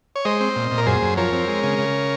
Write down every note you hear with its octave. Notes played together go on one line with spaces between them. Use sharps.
C#5
G#3 C5 D#5
C4
A#2
A#2
A#4
F#2 G#4 C5
F#2
F3 A#4 C#5
C4
G#3
C#3
C#3